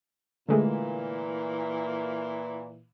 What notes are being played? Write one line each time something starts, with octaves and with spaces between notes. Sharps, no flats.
A#2 D3 E3 G#3 A3